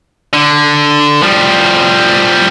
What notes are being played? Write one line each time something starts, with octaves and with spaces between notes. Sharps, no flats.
D3
F3 G3